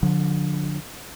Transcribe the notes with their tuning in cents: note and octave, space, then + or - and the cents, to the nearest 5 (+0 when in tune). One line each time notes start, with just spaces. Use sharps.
D3 +0 F3 +35